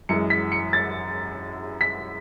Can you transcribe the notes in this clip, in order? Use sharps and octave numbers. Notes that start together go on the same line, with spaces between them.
F#2 E3 G#3 C#7
B6
C#7
A6
B6